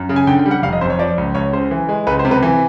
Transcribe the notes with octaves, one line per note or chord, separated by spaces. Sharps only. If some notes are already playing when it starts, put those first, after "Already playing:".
Already playing: F#2
C#3
G#5
D3 G5
G5
G3
F#5
F1 F5
D#5
F2 C5
C#5
F3 D5
C#2
C#2 C#5
C#3 C5
E3
G#3
C#2 B4
C5
C3
B4
E3